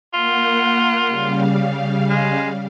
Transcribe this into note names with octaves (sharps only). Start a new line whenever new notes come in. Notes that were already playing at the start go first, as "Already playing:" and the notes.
A#3 F4 F#5
C#3 G3 F5
G#3